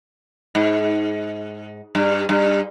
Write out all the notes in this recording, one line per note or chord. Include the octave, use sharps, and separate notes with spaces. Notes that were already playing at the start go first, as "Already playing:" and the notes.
G#2
G2
G2